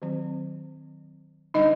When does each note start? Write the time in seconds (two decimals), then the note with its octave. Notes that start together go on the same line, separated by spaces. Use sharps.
0.02 D#3 F#3 C4
1.54 D3 G3 D4 D#4 D#5